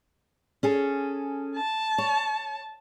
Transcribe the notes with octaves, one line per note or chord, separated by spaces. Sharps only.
C#4 G#4 A4
A5
C#5